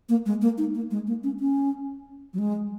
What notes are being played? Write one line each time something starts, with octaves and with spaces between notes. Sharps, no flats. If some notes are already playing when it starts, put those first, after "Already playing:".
A#3
G#3
A#3
D#4
A#3
G#3
A#3
C#4
C#4
F#3
G#3